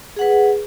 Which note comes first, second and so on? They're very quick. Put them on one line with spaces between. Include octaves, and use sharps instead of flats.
G#4 F#5 B4